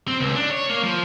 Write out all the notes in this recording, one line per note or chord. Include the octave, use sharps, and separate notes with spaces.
C4
C#2
D4
C#5
A#3
F3